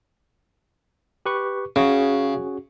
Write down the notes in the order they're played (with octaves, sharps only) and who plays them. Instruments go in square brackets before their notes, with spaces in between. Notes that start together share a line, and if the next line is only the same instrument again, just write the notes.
[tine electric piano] G4 B4 C#6
[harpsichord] C#3 [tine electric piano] C#4 F#4 G#4